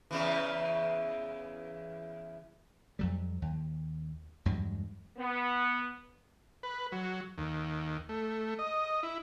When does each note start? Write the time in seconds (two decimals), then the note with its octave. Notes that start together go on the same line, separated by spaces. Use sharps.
0.11 E2 C#3 E3
2.99 F2 F#3 G3
3.42 D#2
4.45 E2 G2 F#3 G#3
5.18 B3
6.63 B4
6.92 F#3
7.38 D#2
8.09 A3
8.59 D#5
9.03 E4